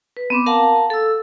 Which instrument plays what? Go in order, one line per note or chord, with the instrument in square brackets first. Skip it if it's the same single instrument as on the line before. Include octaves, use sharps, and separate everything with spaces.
[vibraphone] B4
B3 C4 D6
A#4 F5 F#5 A5 A#5
A4 E6